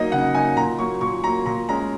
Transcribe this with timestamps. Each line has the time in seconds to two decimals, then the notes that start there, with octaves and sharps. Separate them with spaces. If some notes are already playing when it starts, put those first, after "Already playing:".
Already playing: F#3 A#3 D#4 D#5
0.12 C#3 F#5
0.34 F#3 A#3 D#4 G#5
0.56 A#2 A#5
0.79 F#3 A#3 C#6
1.01 A#2 C#6
1.24 F#3 A#3 A#5
1.46 A#2 A#5
1.69 G#3 C#4 A#5